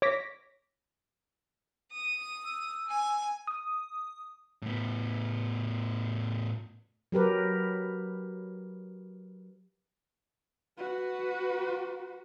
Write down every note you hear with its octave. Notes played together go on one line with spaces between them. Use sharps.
C#5 D6 A#6 B6
D#6
E6
G#5
D#6
A2 B3
F#3 G4 A#4 B4
F#4 B4